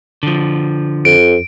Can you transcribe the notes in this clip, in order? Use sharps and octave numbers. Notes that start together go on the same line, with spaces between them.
D3 F3
F2 D7